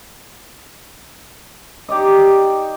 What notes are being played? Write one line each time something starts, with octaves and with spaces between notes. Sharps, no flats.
D#4 G4 D5 D#5